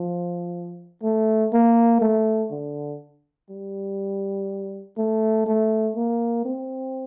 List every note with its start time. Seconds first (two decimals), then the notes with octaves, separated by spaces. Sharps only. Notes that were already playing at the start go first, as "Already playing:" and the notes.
Already playing: F3
1.03 A3
1.53 A#3
2.01 A3
2.52 D3
3.50 G3
4.98 A3
5.47 A3
5.96 A#3
6.45 C4